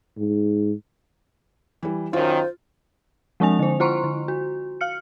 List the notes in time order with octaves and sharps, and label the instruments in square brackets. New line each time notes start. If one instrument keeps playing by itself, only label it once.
[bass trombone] G#2
[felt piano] E3 G3
[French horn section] F#2 D#3 [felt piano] F4 [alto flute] C5
[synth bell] F3 G#3 C4 D4 G#5 F7
D3 C5
E4 F4 C5 A#5 C6 C#6
D3
F#4
F5 F6 C#7